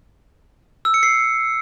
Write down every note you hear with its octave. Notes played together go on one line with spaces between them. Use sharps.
E6
C#7
C7